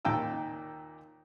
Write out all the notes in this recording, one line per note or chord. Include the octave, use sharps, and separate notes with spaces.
D#2 A#2 D#3 G5 A5 E6